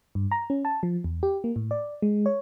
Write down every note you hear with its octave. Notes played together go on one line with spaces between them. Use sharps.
G2
A#5
C#4
A5
F3
E2
G4
A#3
A2
D5
G#3
C#5